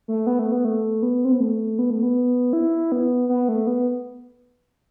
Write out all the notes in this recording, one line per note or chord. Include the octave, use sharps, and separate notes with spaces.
A3
B3
A3
B3
A3
B3
C4
B3
A3
B3
A3
B3
E4
B3
B3
A3
B3